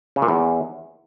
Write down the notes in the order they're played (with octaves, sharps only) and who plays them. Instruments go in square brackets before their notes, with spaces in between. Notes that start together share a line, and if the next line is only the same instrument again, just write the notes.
[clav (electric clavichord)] C#3
A#2
E2